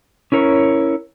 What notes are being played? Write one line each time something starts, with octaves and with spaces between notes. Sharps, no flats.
C#4 E4 A#4 C#5